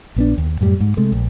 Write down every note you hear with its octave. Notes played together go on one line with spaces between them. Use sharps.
A#1 B3 D4
D#2
F#2 A2 G3
G#2
C3 G#3 A3
A#1